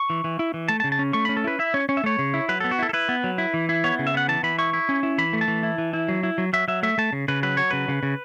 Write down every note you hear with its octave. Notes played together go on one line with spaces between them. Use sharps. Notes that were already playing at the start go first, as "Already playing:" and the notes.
Already playing: C#6
E3
E3
E4
E3
A3 A5
A5
C#3
A5
C#4
A3 C#6
C#4 B5
A4
E4 B4
E4 E5
C#4 C#5
C#4 C#5
E5
A3 C#5
C#3
E4
F#3 B4
B3 A4
F#4
E4 A4
A4
E4 B4
B3
F#3
E4
E3
E4
B3 C#5
C#3
E5
B3 F#5
E3 A5
E3 B5
E4 C#6
E4
C#4
E4
E3 B5
A3
A5
E3
E4
E3
E4
F#3
E4
F#3
F#3 E5
F#3 E5
A3 E5
A3 A5
C#3
C#3 B4
F#3 B4
F#3 C#5
C#3 B4
C#3
C#3